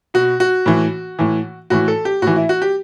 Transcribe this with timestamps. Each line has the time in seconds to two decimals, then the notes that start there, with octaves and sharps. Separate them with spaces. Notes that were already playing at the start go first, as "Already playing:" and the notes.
0.14 B2 F#4
0.40 F#4
0.66 A2 E3
1.19 A2 E3
1.70 A2 E3 F#4
1.88 A4
2.05 G4
2.22 A2 E3 F#4
2.36 E4
2.49 F#4
2.62 G4